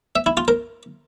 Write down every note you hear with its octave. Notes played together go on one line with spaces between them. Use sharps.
E5
E4
F4
A#4